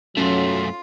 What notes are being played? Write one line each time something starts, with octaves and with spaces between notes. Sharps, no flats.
F#2 F#3 A3 C#4 F4 A4